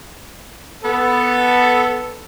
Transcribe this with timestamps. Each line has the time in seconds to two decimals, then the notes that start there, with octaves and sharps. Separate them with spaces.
0.84 B3 A4